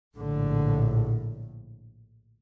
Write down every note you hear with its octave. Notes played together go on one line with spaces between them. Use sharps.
A#1 A2 D3